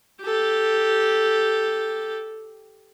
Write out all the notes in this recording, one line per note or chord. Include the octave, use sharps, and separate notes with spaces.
G4 A4